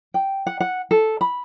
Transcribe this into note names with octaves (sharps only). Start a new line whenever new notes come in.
G5
F#5
F#5
A4
B5